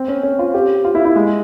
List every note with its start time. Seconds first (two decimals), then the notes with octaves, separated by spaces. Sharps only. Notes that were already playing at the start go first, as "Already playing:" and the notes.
Already playing: C4
0.08 C#4
0.23 C#4
0.39 F4
0.54 G4
0.85 F4
0.95 E4
1.05 E4
1.16 G#3